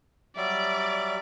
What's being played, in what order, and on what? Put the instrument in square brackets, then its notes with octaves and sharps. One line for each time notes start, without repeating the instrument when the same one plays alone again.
[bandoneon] F#3 G3 E5 [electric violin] D5